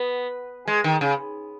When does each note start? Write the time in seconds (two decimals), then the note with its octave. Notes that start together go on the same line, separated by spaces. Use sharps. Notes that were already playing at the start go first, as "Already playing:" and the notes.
Already playing: B3
0.68 G#3
0.84 D#3
1.01 C#3